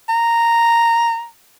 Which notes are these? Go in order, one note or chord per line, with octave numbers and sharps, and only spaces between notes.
A#5